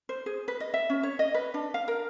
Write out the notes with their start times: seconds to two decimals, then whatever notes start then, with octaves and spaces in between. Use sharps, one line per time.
0.09 C5
0.26 G#4
0.48 B4
0.60 D#5
0.74 E5
0.90 C#4
1.03 C#5
1.19 D#5
1.34 B4
1.54 D4
1.74 F5
1.88 A#4